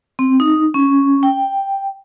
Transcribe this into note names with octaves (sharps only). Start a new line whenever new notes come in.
C4
D#4
C#4
G5